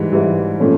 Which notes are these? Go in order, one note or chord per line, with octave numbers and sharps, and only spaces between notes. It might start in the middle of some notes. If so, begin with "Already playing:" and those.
Already playing: G#2 E3 G3
G#2 E3 G3
A#2 F3 A3 C#4